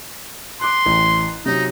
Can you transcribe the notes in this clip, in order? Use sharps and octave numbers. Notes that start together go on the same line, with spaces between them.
C6 D6 F#6
A1
C3 F#3 D#4